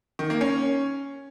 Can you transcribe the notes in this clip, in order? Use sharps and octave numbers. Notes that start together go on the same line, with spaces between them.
D#3
A#3
C#4